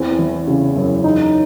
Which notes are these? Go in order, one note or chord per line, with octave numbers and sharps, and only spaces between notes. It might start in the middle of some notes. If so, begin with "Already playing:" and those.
Already playing: E2 C4
E3
C#3
F#2
D#4